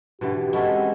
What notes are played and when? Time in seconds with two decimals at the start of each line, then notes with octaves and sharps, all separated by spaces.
0.21 B2 D3 E3 G4
0.53 G#3 C4 C#4 E4 A4 F#5